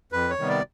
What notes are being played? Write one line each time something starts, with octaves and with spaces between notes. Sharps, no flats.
F2 B4
C#5
C3 D#3 G3 B3
D5